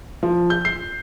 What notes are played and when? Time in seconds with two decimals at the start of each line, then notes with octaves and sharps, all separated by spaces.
0.23 F3
0.50 G6
0.65 C7